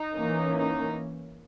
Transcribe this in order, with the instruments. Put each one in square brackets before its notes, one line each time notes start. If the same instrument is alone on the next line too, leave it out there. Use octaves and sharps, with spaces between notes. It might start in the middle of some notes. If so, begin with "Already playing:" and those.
Already playing: [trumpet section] D#4
[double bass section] E3 A#3 C#4
[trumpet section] D#4